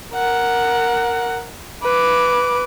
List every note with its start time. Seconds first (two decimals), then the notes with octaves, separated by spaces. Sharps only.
0.14 A#4 F#5
1.83 B4 D6